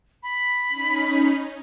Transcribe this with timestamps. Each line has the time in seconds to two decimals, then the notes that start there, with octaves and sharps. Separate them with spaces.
0.23 B5
0.68 C#4 D#4